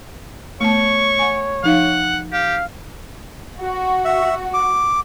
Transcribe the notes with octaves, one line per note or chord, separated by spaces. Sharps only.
A3 B3 C#5 A5 C#6
F#5 G#5
F3 D#4 F5 F#5
G4 F5
F#4
E5
D6